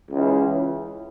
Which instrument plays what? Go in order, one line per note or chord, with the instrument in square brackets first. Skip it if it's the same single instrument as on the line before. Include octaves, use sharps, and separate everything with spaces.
[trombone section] C#2 C#3 E3